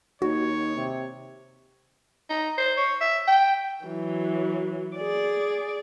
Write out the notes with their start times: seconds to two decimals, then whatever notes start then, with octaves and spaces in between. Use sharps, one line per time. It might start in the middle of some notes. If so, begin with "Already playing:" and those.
0.22 D#2 D#4 F#4 C#5
0.76 C3
2.30 D#4
2.58 C5
2.77 C#5
3.01 E5
3.27 G5
3.85 E3 F#3
4.97 G#4 D5